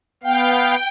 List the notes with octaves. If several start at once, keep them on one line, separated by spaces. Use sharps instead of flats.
B3 F5 G5